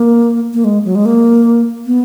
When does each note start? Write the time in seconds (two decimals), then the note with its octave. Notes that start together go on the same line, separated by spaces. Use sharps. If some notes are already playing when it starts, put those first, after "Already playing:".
Already playing: A#3
0.54 A#3
0.64 G#3
0.85 F#3
0.95 G#3
1.05 A#3
1.86 B3